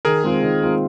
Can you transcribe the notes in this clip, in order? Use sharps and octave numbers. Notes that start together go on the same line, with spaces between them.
D#3 G#4 A#4
G#3 C4 F4
D#3
G#3 C4 F4